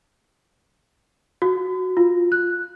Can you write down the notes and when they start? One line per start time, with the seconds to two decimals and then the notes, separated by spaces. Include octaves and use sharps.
1.42 F#4
1.97 F4
2.32 F#6